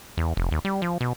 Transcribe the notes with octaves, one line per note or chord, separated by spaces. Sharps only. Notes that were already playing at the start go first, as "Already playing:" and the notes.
E2
F1
D#2
G3
F3
B2